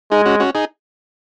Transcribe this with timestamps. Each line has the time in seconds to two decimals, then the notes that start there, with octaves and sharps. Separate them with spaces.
0.11 G#3 D#4 G#4
0.25 C#4 F#4
0.40 C#4 F#4
0.55 D#4 G#4